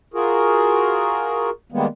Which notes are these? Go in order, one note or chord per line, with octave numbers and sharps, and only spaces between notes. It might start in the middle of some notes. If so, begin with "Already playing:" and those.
F4 F#4 G#4 A#4
D#3 G3 G#3 A#3 B3